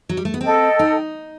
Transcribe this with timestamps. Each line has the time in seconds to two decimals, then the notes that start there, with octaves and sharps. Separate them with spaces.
0.09 F#3
0.17 G3
0.25 A3
0.34 B3
0.41 C4 A4 D#5 G5
0.79 D#4